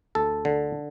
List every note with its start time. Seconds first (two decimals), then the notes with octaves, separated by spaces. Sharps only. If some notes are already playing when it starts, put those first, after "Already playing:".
0.15 D2 A4
0.45 D3